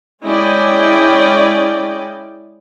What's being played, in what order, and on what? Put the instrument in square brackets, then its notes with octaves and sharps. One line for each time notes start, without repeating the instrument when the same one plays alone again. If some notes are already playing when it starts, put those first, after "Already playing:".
[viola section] G#3 C#4 E4 D5 D#5 G5